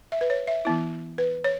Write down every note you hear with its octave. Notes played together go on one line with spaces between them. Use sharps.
E5
B4
C#5
E5
E3 B3 E4
B4
C#5